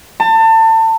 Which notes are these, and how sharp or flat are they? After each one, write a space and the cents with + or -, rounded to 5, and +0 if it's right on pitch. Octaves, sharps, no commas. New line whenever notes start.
A5 +30